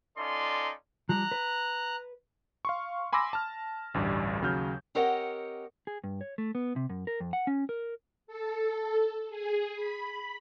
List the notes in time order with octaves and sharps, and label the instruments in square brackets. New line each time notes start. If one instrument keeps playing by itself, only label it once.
[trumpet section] C#4 D#4 F4 A4 D5 C6
[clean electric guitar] F3 G3 [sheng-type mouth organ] A#5 F#6
[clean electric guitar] B4
[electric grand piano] F5 C6 C#6
G#5 B5 C6 D6 E6 A#6
A5 F6
A1 D2 G2 G3 D5
D#2 C#3 F#3 F6 G6
[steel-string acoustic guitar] C4 G4 A#4 C#5 D#5 F#5
[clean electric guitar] G#4
G2
C#5
A3
B3
C3
F#2
A#4
F2
F#5
C#4
A#4
[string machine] A4
G#4
B5